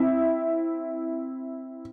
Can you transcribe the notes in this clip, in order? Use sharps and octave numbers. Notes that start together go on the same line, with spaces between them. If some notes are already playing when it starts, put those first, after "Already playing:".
Already playing: C4 E4